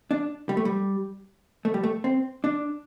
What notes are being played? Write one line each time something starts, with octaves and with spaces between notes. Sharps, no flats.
D4
G3
A3
G3
A3
G3
A3
C4
D4